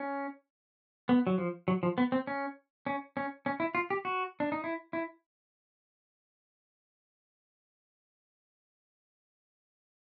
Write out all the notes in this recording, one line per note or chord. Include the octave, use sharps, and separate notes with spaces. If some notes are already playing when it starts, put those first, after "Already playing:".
Already playing: C#4
B3
F#3
F3
F#3
F3
B3
C4
C#4
C#4
C#4
C#4
E4
F4
G4
F#4
D4
D#4
E4
E4